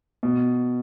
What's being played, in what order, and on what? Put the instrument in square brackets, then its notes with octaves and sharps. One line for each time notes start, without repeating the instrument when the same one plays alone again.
[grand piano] B2